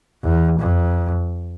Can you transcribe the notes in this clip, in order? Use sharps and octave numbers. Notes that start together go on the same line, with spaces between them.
E2
F2